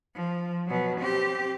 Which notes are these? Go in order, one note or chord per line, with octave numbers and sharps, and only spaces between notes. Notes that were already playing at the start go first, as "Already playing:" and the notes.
F3
B2 F#3
C4 G4